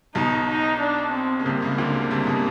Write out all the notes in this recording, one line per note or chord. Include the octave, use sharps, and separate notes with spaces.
B1 B2 D#4
D#4
D4
C4
C#3
C2 C3 A#3
C#2 C#3
D2 D3
C2 C3
B2